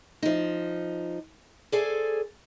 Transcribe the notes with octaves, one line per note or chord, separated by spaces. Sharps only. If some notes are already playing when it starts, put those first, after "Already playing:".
F3 D#4
G#4 A4 C5 D5 G#5